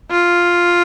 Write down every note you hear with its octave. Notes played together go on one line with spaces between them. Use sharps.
F4